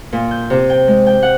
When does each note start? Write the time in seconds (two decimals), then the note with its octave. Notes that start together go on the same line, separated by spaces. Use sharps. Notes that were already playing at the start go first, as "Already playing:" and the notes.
0.13 A#2
0.31 G6
0.50 C3
0.70 G5
0.88 G#3
1.06 G5
1.23 F#5